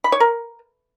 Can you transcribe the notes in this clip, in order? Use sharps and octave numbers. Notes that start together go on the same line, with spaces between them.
B5
C#5
A#4